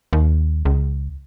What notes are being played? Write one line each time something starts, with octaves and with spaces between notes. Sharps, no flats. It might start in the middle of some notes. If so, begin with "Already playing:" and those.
D#2
C#2